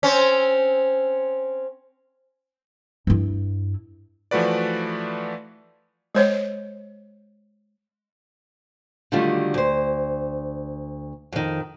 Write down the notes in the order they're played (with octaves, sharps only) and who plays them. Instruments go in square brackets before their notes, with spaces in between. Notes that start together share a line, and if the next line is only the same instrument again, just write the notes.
[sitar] C4 C#4
[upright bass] G2 E4
[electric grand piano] E3 F3 A3 F#4 B4 D5
[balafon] G#3 C5 C#5
[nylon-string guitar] D3 D#3 F#3 G3 A3 F4
D2 C5
F2 D#3